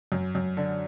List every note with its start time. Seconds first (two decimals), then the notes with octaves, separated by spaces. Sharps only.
0.12 F#2
0.35 F#2
0.57 D3